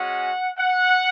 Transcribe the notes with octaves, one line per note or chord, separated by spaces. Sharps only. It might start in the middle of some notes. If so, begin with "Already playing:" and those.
Already playing: G#3 C#4 F#4 F#5
F#5